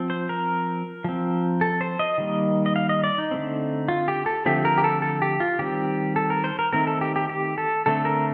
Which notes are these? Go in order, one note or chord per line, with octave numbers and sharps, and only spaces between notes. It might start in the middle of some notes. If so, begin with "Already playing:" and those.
Already playing: F3 C4
C5
A#4
F3 C4
A4
C5
D#5
D#3 G3 A#3
D#5
F5
D#5
D5
D#4
D3 A3 C4
F4
G4
A4
D3 F3 A3 C4 G4
A#4
G4
A4
A4
G4
F4
D#3 G3 C4 G4
A4
A#4
C5
A#4
D#3 A3 C4 A#4
A4
G4
G4
G4
A4
D3 A3 C4 A4
A#4